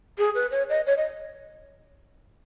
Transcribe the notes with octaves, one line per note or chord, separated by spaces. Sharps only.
G#4
B4
C#5
D#5
C#5
D#5